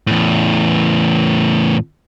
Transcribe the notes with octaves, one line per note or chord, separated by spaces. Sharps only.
E2 A2